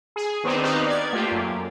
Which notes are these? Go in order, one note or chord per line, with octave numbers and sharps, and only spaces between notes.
G#4
D#3 B3 C4 D4 D#4
D#4 F#4 G4 B4 F5
D5 G#6
A3 A#3 F4 G4 G5
F#2